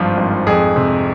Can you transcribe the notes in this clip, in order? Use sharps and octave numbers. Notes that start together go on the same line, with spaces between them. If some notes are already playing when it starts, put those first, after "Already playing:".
Already playing: G#1 G2 F3 F4
G#1
F2 G#4
C3